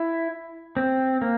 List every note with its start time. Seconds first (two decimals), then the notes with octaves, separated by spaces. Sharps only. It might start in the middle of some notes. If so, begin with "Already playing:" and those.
Already playing: E4
0.77 C4
1.22 A#3